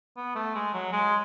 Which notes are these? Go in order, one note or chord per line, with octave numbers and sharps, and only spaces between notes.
B3
A3
G#3
F#3
G#3